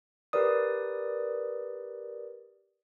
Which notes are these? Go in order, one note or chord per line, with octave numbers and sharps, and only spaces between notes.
G4 A#4 B4 D5 D#6